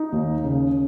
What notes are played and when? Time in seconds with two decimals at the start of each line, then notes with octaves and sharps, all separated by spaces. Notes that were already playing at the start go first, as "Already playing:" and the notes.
Already playing: D#4
0.12 D#2
0.44 C#3